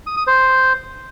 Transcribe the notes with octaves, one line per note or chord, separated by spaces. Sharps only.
D#6
D#6
C5